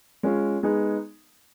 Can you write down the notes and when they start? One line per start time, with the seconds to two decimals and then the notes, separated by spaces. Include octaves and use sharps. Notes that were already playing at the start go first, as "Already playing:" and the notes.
0.23 G#3 C#4 F4
0.63 G#3 B3 D#4 G#4